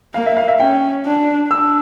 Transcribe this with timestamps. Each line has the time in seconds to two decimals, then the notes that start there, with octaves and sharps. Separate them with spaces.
0.14 A#3 F5
0.26 E5
0.37 F5
0.48 E5
0.60 C#4 G5
1.05 D4
1.50 D4 E6